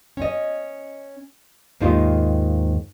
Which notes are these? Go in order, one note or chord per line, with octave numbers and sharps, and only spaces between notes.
C#4 D#5
D#2 G#2 A#3 D#4 F4 G4